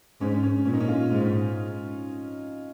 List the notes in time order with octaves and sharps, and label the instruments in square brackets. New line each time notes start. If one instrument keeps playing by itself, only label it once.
[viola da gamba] G#2 [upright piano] C#4
[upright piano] C#4
[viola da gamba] A#2 [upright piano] C#4
[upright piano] D#4
C#4
F4
[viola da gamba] G#2